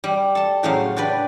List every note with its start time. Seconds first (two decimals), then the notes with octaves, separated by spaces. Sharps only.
0.04 G3
0.35 A4 A5
0.63 A2 C#3 F#3 C5 F5
0.96 D4 G4 B4 D5